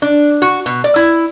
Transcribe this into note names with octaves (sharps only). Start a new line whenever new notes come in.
D4
F#4
B2
D5
E4